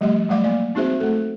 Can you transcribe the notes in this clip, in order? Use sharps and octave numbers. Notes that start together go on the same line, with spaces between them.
F3 G3 A3 G4 D#5
F#3 G3 A3 D5 F5 D6
A#3 D5
C4 D#4 F#4 G#4 C5 E5
A3 A4